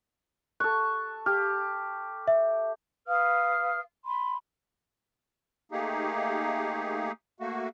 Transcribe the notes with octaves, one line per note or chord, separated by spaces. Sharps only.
A4 C#6 F#6
G4 F6
E5
B4 F5 D#6 F6
B5 C6
A3 A#3 D#4 G4 G#4
A3 A#3 F#4